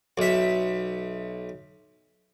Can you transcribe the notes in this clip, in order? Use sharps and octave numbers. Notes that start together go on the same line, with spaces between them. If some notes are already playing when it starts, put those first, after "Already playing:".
B1 E5